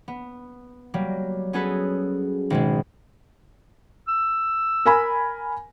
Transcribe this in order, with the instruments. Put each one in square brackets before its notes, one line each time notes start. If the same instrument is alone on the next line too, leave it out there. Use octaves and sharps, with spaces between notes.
[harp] B3
F#3 G3 A#3
B3 C#4 F#4 G#4 A4 B4
G#1 B2 G#3
[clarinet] E6
[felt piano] A#4 G#5 B5